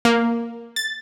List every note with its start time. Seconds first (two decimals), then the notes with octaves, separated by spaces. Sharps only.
0.05 A#3
0.76 A6